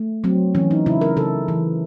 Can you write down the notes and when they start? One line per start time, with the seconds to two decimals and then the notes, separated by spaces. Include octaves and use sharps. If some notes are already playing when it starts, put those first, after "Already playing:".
Already playing: A3
0.24 F#3 C4
0.55 E3 C#4
0.71 D#4
0.86 C#3 E4
1.01 A#4
1.17 C#3 A4
1.48 E3